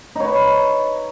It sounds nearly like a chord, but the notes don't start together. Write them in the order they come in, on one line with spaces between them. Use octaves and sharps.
D#4 C#5 B4